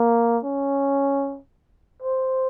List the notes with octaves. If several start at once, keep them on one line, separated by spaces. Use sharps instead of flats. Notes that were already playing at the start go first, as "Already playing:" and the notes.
Already playing: A#3
C#4
C5